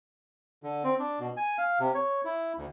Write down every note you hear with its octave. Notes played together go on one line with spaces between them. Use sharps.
D3
C4
D4
B2
G#5
F5
C3
C#5
E4
D2